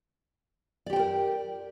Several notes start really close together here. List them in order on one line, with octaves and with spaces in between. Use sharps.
D5 G4 G5 C5 A#4